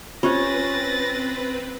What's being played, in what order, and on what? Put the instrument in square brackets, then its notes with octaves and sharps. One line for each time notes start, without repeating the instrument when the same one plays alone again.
[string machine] C4 B4 [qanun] C#4 [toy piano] F4 G4 C5 [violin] A6 A#6